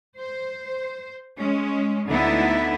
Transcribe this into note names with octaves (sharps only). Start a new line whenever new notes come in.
C5
G#3 C#4
D2 D3 B3 D#4 E4 E5